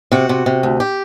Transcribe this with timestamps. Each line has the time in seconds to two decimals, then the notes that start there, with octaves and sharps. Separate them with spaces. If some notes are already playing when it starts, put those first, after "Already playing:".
0.12 C3 F#4
0.29 C3
0.46 C3
0.63 D2
0.80 G4